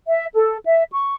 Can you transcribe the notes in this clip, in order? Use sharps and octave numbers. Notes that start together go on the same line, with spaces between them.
E5
A4
E5
C#6